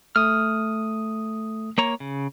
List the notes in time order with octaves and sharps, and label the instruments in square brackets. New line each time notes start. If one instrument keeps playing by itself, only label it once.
[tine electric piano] A3 D#6 [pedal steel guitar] F6
[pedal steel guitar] A#3 C#5 A#5
C#3